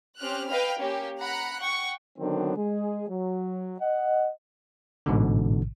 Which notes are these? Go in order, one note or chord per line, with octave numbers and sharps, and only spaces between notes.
C4 C#4 G4 F6 F#6
B4 D#5 F5 G5 B5 F6
A#3 C#4 G4
F#5 A#5 B5 F#6 C#7
F#5 G5 C#6
D3 D#3 F#3 B3 C4 D4
G#3 G#4
F#3
D#5 F#5
A1 G#2 B2 D3